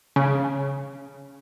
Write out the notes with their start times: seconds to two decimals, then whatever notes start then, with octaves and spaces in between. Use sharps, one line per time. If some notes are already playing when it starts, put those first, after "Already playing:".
0.16 C#3